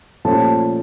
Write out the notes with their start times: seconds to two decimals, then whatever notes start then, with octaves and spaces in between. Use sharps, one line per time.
0.25 A#2 F3 A3 C#4 G4 A5